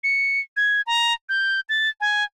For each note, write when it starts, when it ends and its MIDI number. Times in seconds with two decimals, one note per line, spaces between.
0.04 0.40 97
0.57 0.81 92
0.87 1.13 82
1.29 1.60 91
1.69 1.90 93
2.01 2.24 80